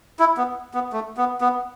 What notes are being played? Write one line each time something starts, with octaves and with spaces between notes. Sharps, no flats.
E4
B3
B3
A3
B3
B3